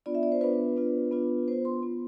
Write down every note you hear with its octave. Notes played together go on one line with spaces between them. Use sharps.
B3 D4 F4 D5
E5
D5
C5
B3 D4 F4 B4
B3 D4 F4
B3 D4 F4
B3 F4 C5
C6
B3 F4